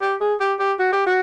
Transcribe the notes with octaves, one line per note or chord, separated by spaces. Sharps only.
G4
G#4
G4
G4
F#4
G4
F#4